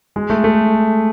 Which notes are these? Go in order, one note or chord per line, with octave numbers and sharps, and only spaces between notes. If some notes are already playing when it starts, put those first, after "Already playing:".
G#3
A3
A3